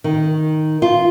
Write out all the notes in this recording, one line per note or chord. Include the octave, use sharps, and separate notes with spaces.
D#3
F4